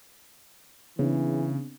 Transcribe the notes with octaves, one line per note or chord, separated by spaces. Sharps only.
C#3 E3 B3 C4 D4